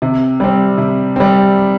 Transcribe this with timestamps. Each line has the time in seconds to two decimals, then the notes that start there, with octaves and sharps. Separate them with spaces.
0.02 C3
0.40 G3 C4
0.78 C3
1.16 G3 C4